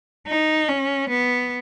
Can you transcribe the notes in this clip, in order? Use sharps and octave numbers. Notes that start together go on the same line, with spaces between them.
D#4
C#4
B3